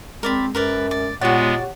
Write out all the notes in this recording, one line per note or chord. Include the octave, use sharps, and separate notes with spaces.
G#3 C4 A#4 D5 B5
F#2 A#4 B4 D5
D5
A#2 G#3 B3 F#4 G4 C#5 D5 F#5